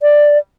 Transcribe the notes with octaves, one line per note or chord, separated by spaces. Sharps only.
D5